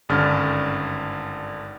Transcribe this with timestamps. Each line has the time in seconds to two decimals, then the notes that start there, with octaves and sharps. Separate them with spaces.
0.09 G#1 G2 D3 C#4 F6 A6